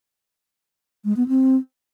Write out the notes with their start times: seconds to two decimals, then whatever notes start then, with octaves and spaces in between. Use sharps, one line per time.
1.05 G#3
1.17 B3
1.28 C4